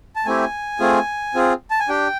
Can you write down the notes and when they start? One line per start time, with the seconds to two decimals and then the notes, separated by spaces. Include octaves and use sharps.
0.16 A5
0.25 A3 C4 E4 G4 G#5
0.80 A3 C4 F4 G#4
1.35 C4 F4 G#4
1.70 A5
1.80 G#5
1.89 D4 G4 G5